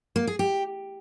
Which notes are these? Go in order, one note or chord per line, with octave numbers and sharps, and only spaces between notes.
A#3
G#4
G4